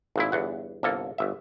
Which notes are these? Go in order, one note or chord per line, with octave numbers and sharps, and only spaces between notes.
G#1 A#2 E4
G1 E2 F#5
G1 C2 A#3 A4
G1 E5